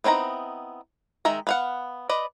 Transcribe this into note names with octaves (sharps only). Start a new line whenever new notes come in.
B3 C4 D#4 E4 A#5
D#3 G#3 E5 A#5
B3 F5 F#5
B4 D5 D#5